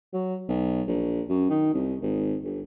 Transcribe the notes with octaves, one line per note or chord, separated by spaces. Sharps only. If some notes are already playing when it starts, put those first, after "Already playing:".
F#3
B1
A#1
F#2
D#3
C2
G#1
G1